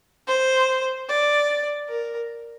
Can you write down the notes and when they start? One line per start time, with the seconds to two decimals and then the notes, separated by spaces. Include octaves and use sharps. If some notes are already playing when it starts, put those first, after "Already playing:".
0.27 C5
1.09 D5
1.88 A#4